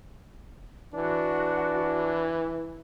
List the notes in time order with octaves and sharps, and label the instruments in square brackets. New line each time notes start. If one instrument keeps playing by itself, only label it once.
[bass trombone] E3 [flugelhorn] D4 [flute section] F#4